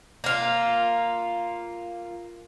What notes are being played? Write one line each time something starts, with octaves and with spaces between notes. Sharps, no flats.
A#3 F4